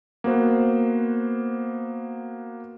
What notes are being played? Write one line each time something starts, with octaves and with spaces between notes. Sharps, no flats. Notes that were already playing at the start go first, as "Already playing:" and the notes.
A#3 B3 F#4 C5